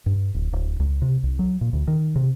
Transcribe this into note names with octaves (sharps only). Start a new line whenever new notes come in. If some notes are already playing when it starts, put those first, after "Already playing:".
G2
D1
D1
C#2
C3
C2
F#3
A#2
D2
D#3
C3